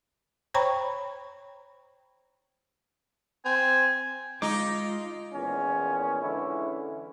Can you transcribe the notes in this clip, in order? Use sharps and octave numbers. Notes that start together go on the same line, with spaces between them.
C5 C#5 G5 A#5 B5 C#6
C4 G#5
G#3 D#4 F4 D6
E2 A#2 D#3 F3 C#4
D3 E3 G#3 C#4 E4